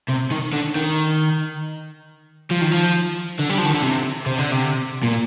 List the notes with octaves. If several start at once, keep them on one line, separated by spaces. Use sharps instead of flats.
C3
D#3
D3
D#3
F3
D#3
F3
D3
G3
F3
D#3
D3
C3
C3
D3
C3
A#2